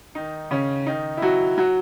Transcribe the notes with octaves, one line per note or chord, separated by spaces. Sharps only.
D#3 D#4
C#3 C#4
D#3 D#4
E4
F#3 F#4
F#3 F#4